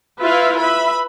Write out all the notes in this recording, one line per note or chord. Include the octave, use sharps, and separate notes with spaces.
E4 F4 B4 E5 F5
B4 E5 B5